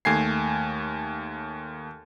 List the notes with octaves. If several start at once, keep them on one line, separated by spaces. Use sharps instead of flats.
D#2 A3 G#5 G#6 C7